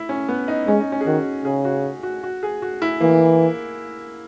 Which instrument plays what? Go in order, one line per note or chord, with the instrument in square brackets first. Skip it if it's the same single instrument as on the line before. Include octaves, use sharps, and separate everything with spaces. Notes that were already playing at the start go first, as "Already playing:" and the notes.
Already playing: [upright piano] E4
C#4
B3
D#4
[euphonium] G#3 [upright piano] C#4
[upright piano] D#4
C#4
G#4
[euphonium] D#3 [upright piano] F#4
[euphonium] C#3 [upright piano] G#4
[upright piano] F#4
F#4
F#4
G#4
F#4
E4
[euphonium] E3 [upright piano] A#3